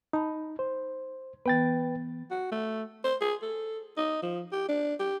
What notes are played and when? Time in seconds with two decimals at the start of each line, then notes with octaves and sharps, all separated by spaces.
0.13 D#4 A5 B5
0.59 C5
1.46 E3 B3 B4 G5 A6
2.31 F#4
2.52 A3
3.04 C5
3.21 G#4
3.42 A4
3.97 D#4
4.22 F3
4.52 G4
4.69 D4
5.00 G4